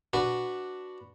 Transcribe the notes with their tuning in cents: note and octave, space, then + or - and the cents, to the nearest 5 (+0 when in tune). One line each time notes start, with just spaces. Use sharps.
D4 +0 F#4 +0 B4 +0